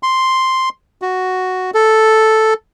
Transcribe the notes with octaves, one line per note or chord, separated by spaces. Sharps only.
C6
F#4
A4